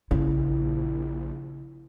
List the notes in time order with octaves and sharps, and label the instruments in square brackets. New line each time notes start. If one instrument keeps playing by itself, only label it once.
[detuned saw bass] A#1 [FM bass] C#3 [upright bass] E4